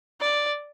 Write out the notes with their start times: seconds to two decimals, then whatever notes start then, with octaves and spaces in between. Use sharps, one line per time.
0.21 D5